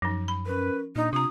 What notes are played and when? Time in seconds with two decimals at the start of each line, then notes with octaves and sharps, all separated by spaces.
0.02 F#2 F3 D#4
0.28 B5
0.46 C#4 A#4 B4
0.96 A#2 D4 D#4
1.13 C3 F4 A#5 D#6